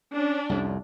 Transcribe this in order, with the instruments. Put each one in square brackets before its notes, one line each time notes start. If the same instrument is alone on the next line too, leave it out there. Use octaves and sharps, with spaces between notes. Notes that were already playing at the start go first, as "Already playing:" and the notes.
[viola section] C#4 D4
[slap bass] C2 F2